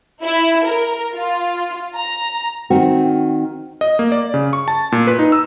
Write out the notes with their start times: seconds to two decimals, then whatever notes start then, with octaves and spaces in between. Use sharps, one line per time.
0.22 E4
0.64 A#4
1.14 F4
1.95 A#5
2.70 D#3 C4 F#4
3.81 D#5
3.99 A#3
4.12 D5
4.34 C#3
4.53 C#6
4.68 A5
4.92 A#2
5.07 B4
5.19 D#4
5.32 E6